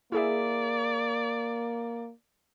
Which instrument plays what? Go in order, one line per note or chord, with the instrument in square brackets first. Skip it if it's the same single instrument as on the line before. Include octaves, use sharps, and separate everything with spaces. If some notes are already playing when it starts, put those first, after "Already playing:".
[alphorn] A#3 [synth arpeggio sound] E4 G#4 E5 [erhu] D5